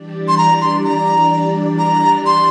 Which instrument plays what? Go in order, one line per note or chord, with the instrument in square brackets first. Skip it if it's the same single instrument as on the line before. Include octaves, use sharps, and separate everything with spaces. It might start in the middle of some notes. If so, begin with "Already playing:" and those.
Already playing: [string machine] E3 G3 D4 G4 D5
[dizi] C6
A#5
C6
A#5
A#5
C6